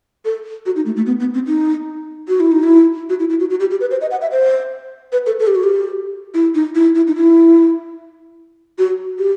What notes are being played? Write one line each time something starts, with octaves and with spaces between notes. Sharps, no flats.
A4
F#4
D#4
A3
A3
B3
B3
C4
D#4
F#4
E4
D#4
E4
F#4
E4
E4
F#4
F#4
G4
G4
B4
C5
D#5
F#5
E5
C5
B4
A4
A4
G4
F#4
G4
E4
D#4
E4
E4
D#4
E4
F#4
G4